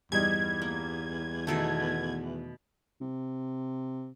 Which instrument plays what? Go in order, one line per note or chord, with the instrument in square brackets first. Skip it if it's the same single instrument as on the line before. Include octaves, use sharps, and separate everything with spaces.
[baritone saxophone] E2 [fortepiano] G2 G3 D#4 [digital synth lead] G#6
[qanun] A#3
B2 D#3 A3
[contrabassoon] C3